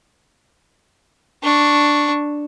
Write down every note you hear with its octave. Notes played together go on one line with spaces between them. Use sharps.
D4 C#6